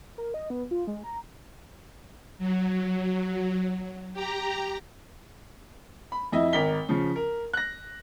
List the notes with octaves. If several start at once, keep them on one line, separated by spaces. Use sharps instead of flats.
A#4
D#5
B3
F4
G#3
A#5
F#3
G4 A#5
B5
F2 E4 D#5 E5
G#1 A#4 B6 G7
C#3 F3
A#4
F#6 A#6